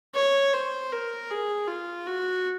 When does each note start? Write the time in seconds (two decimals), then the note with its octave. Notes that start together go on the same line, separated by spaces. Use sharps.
0.15 C#5
0.53 C5
0.92 A#4
1.30 G#4
1.68 F4
2.07 F#4